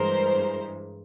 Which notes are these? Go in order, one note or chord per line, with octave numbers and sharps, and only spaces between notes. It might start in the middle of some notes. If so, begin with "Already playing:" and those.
Already playing: G2 E3 G#3 A#4 C5